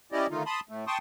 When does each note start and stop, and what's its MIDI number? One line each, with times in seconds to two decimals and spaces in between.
0.12 0.27 61
0.12 0.27 64
0.12 0.27 67
0.12 0.27 74
0.12 0.27 75
0.30 0.43 50
0.30 0.43 51
0.30 0.43 57
0.30 0.43 63
0.30 0.43 65
0.46 0.60 81
0.46 0.60 83
0.46 0.60 84
0.46 0.60 87
0.69 0.85 45
0.69 0.85 57
0.87 0.98 79
0.87 0.98 81
0.87 0.98 84
0.87 0.98 85
0.87 0.98 87